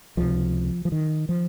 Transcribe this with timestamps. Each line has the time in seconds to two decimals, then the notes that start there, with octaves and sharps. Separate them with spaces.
0.17 C#2 C3 F3
0.85 F3
0.92 D#3
1.29 F3